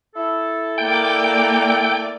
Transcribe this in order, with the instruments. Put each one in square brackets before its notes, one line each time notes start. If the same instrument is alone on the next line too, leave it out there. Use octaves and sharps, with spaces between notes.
[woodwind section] E4 A4
[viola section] A#3 D5 [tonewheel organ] G5